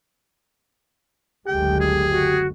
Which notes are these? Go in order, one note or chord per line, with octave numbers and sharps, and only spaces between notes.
F#1 D2 G#3 G4 G5
G#4
F#4